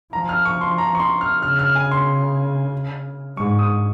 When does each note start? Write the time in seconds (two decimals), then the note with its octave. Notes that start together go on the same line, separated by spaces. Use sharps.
0.13 F3 A#5
0.29 F6
0.45 C#6
0.61 C6
0.78 A#5
0.95 C#6
1.00 C6
1.21 F6
1.42 C#3 F6
1.59 F6
1.75 G#5
1.91 C6
3.37 G#2 C#6
3.59 D#6